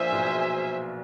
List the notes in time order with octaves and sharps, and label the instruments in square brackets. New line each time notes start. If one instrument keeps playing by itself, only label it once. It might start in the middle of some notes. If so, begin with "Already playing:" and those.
Already playing: [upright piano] A#1 A#2 [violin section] G#4 C5 E5 G#5
[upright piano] B1 B2